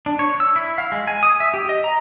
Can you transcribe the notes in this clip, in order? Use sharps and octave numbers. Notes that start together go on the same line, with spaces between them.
D4
C#5
E6
E4
F5
G#3
G#5
D#6
E5
G4
D#5
A#5